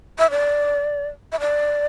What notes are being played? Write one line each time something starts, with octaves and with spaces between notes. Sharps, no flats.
E5
D5
E5
D5